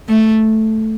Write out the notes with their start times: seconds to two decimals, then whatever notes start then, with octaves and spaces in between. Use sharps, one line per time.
0.09 A3